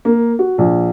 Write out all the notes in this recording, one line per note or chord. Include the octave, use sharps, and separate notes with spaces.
A#3
F#4
A#1